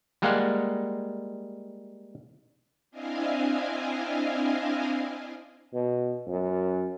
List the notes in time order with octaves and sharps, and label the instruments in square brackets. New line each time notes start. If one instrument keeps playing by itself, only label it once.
[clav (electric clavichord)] G3 G#3 A#3 F5 F#5
[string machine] C4 D4 E4 D#5 F5 G#5
[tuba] B2
F#2